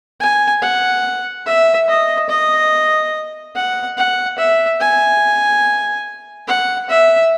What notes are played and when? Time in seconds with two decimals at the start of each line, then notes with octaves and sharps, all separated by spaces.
0.20 G#5
0.62 F#5
1.46 E5
1.88 D#5
2.29 D#5
3.55 F#5
3.97 F#5
4.38 E5
4.80 G#5
6.48 F#5
6.90 E5